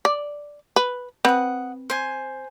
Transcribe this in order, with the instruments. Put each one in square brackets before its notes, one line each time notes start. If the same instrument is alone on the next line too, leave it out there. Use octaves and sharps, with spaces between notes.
[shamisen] D5
B4
[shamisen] C4 B4 [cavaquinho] F#5 D#6
[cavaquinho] C5 G#5